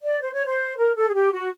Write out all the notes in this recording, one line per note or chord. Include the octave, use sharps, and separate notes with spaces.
D5
C5
C#5
C5
A#4
A4
G#4
G4
F#4